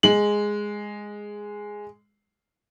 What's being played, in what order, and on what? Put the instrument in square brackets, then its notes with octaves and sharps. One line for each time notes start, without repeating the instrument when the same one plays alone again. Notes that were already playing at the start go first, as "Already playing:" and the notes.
[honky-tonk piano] G#3 F#7